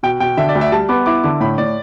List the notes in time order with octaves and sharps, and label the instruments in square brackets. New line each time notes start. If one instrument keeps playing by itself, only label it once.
[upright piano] B2 [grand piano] G5
[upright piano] B2 [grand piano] G5
[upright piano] D3 [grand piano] E5
[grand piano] D5
[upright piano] D2
[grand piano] E5
[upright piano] G3 [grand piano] A5
[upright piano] B3 [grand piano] D6
[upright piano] E4 [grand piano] D6
[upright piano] D3 [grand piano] D6
[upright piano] A2 [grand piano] B5
[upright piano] A2 [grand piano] D5